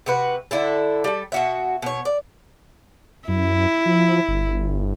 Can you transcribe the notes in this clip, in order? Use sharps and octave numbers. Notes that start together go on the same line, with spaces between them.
C3 F#4 B4
D3 E4 A4
G3 A4
B2 F#4 E5
B2 C#5
D5
F#2 E4
F3
G1